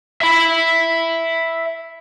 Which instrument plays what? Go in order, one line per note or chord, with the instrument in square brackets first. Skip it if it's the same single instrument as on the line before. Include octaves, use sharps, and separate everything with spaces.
[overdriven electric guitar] E5 B5